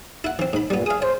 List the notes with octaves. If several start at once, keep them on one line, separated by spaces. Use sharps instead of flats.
E4 F#5
E3 C4
G#2 B5
G2 A#2 G3 B3
G#4 F5 D#6
C5 C#5